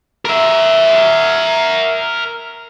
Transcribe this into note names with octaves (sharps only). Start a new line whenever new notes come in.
A#4 E5